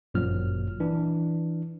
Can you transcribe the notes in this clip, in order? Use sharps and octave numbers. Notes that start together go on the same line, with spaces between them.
G1 F#2 A#2 F3 F#3 F6
E3 D4